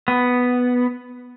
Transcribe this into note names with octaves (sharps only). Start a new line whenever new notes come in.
B3